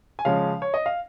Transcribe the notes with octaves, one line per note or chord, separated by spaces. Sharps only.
G#5
C#3 F3 G#3 C#4 F5
C#5
D#5
F5